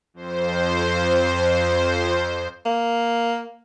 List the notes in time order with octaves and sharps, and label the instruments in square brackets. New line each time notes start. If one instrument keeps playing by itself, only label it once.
[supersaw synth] F2 C5
[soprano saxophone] A#3